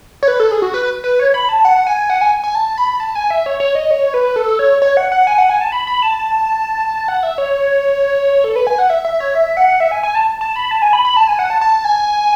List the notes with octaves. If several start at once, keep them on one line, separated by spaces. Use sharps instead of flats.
C#5
B4
A4
G#4
F#4
B4
B4
C#5
B5
A5
F#5
G#5
F#5
G#5
G#5
A5
B5
A5
G#5
E5
C#5
C#5
D#5
C#5
B4
A4
C#5
C#5
F#5
F#5
G#5
F#5
G#5
A5
B5
B5
A5
F#5
E5
C#5
A4
B4
G#5
F#5
E5
E5
C#5
E5
F#5
E5
G#5
G#5
A5
A5
B5
A5
G#5
B5
B5
A5
G#5
F#5
A5
A5
G#5